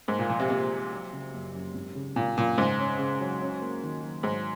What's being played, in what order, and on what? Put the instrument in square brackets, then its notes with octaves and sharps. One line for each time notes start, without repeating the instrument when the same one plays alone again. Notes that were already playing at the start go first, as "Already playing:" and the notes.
[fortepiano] G#2 [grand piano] A#3
[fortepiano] A#2
[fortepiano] A#2 [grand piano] F3
[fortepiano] C3
[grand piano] A#1 [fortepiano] C3
[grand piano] A#2
F#3
C#3
F#1
F#2
G#1
C#3
[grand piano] G#1 [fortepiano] A#2
[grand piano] F#2 [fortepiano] A#2
[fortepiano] G#2 [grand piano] C#3
[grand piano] C#4
C#3
F#3
C#4
A#3
D#3
F#3
[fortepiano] G#2 [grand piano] F#3